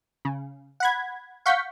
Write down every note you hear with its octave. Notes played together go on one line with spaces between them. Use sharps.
C#3
F#5 B5 G#6
F5 F#5 C#6 G6 B6